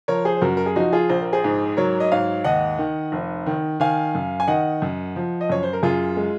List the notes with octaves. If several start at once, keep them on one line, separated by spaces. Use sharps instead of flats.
F3 A#4 C#5
G#4 C5
C5
F#2 F#4 A#4
A#4
G#4
F3 D#4 F#4
F4 G#4
A#1 C5
A#4
G#4 C5
G#2
F#3 A#4 C#5
D#5
G#2 C#5 F5
D#2 D#5 F#5
D#3
F1
D#3
D#3 F5 G#5
F#2
G#5
D#3 D#5 F#5
F#2
F3
D#5
F#2 C#5
C5
A#4
F#2 F4 G#4
G#3